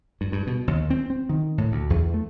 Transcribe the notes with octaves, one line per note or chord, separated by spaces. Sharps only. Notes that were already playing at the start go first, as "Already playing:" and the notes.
G2
G2
B2
D#2
C4
C4
D#3
A2
D2
E2
A3